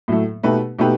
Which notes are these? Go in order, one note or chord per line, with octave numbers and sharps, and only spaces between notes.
A2 F#3 A3
B2 A3 D#4 G4 B4
B2 A3 D#4 G4 B4